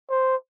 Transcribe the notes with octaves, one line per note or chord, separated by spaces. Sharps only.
C5